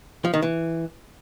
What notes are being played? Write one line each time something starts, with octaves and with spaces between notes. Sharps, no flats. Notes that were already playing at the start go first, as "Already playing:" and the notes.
F3
D#3
E3